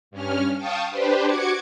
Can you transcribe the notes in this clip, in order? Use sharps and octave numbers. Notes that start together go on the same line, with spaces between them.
G2 C#4 F6
F5 G5 A5 C#6 D#6
D4 G4 B4 C5
F#4 D6 G#6 C#7